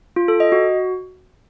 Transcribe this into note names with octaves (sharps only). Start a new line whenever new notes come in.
F4
A4
D#5
F#4